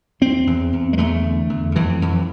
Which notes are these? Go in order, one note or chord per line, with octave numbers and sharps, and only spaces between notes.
E2 C4
E2
E2
G#3
E2 A3
D3
E2
F2 E3
F2